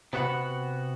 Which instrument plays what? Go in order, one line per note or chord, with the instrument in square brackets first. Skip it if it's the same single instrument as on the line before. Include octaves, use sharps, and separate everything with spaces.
[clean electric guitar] C3 B3 F#4 C5 F#5 B5